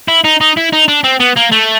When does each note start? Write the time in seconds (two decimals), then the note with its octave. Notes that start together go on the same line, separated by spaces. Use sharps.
0.08 E4
0.24 D#4
0.41 D#4
0.57 E4
0.73 D#4
0.88 D4
1.04 C4
1.20 B3
1.37 A#3
1.52 A3